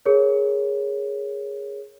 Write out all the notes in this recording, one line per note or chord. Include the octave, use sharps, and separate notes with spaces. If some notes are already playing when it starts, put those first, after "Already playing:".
G#4 A#4 C#5